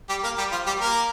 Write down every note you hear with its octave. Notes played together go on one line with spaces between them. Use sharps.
G3 G4
A#3 A#4
G3 G4
F3 F4
G3 G4
A#3 A#4